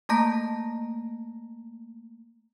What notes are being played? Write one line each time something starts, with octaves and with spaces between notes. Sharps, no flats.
A3 A#3 A5 A#5 A#6